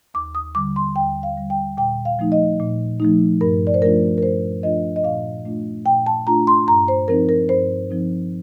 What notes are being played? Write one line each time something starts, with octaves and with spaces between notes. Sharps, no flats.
D#2 D6
D#6
D3 G3 D6
C6
D#2 G5
F5
D3 G3
G5
A#2 G5
F5
F3 A3 D#4
D#5
A#2
F3 A3 D#4
G2 A#4
D5
C5
F3 A3 D4 F4 A#4
A#4
G2 C5
F3 A3 D4 F4 D#5
D#5
A#2 F5
A3 D4 F4
A#2 G5
A5
A3 D4 F4 A#5
C6
G2 A#5
C5
F3 C4 D#4 A#4
A#4
G2 C5
F3 C4 D#4